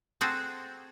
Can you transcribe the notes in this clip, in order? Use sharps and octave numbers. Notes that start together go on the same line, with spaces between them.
C4 F#4 G#4 A4 C5